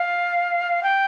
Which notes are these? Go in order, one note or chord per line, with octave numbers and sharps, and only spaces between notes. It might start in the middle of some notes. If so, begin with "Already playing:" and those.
Already playing: F5
G5